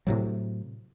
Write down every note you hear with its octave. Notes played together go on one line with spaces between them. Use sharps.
A2 C3 F#3